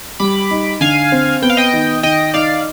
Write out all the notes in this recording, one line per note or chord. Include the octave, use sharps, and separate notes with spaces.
G3 B5 D6
D#4
D3 F5 G#5
C4
B3 G5
F5
D#5 G5
D#3
D#3 D#5 G5
D#4 D5 F5